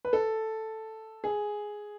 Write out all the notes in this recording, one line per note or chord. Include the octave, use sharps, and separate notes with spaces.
B4
A4
G#4